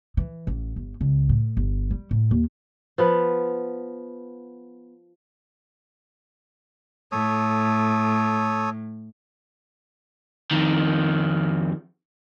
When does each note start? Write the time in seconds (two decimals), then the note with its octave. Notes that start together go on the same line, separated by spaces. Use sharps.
0.17 E3
0.47 A1
0.76 G1
1.01 C#2
1.29 A2
1.57 G1
1.91 G3
2.11 A2
2.31 D#2
2.98 F3 B3 B4
7.12 A2 A4 C#5 D#6
10.51 F2 D#3